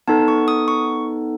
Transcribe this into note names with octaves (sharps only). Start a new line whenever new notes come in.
B3 D#4 A4 A5
C#6
D#6
C#6